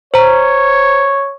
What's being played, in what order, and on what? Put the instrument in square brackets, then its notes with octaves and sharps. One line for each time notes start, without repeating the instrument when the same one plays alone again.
[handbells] C5 A#5 [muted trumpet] C#5